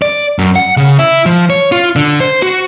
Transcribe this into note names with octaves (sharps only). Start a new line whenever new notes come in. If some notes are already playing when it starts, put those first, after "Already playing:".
D5
F#2
F#5
C#3
E4
F3
C#5
F4
D3
C5
F#4